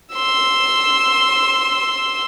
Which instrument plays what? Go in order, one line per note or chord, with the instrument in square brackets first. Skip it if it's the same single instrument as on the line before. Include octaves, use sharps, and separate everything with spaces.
[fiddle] C6 E6